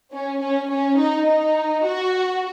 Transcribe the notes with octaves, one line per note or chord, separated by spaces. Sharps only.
C#4
C#4
C#4
D#4
D#4
F#4